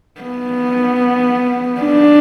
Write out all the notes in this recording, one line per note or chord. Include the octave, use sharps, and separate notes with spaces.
B3
D4